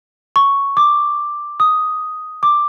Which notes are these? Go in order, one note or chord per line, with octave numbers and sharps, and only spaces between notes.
C#6
D6
D#6
D6